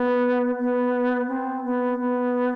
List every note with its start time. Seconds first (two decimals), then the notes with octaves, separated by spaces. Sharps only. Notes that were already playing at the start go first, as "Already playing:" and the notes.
Already playing: B3
0.59 B3
1.28 C4
1.64 B3
1.99 B3